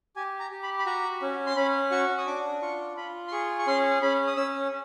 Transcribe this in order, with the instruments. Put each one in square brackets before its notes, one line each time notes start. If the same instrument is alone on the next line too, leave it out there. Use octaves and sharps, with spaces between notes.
[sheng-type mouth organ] G4 G#5
A#5
G4
B5
B5
F#4 A#5
C#4
C6
C#4 B5
F#4 C#6
D#6
D4 D6
F4 C#6
F4 B5
C6
G#4 C#6
C#6
C#4 C6
C#4 B5
D#6
C#4 E6